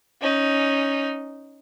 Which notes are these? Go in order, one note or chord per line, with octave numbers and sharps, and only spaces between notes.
C#4 D#4